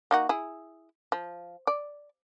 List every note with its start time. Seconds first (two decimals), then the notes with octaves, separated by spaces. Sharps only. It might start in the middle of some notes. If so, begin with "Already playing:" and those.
0.11 A#3 D#4 F#4
0.29 E4 G#4
1.12 F3
1.67 D5